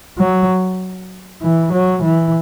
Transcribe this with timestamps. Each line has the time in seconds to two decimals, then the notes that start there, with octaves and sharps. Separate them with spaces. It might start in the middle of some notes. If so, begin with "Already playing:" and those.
0.18 F#3
1.41 E3
1.72 F#3
2.02 E3